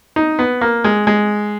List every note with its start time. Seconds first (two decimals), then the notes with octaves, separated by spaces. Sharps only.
0.16 D#4
0.39 B3
0.61 A#3
0.84 G#3
1.07 G#3